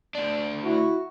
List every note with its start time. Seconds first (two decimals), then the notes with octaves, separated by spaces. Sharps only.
0.15 D2 D4
0.64 E4 F#4